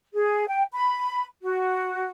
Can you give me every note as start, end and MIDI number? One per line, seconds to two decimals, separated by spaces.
0.14 0.45 68
0.48 0.63 79
0.73 1.23 83
1.43 2.09 66